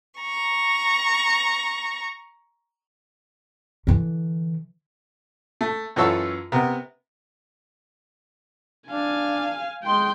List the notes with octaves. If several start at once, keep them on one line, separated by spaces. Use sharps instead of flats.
A#5 C#6
D3 E3
A3
F#2 E3 F4 A4 C#5 E6
C3 B3 A#4
D4 F5 G#5
G#3 G5 C6